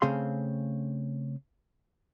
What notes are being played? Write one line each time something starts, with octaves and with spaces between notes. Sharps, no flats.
C#3 A3 C4 G#4 F5 C6